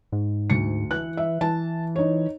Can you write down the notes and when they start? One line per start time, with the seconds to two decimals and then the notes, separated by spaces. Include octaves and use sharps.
0.12 G#2
0.50 D2 C#7
0.91 E3 F#6
1.17 E5
1.41 E3 A5
1.96 D#4 C#5